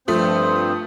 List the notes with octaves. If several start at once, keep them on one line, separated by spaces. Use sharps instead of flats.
G2 F3 A3 C4 C5 D#6